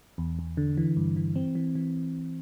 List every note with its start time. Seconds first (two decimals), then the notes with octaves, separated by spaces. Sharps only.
0.18 E2
0.39 E2
0.57 D3
0.77 E3
0.97 G2
1.16 E3
1.36 C4
1.55 E3
1.75 E3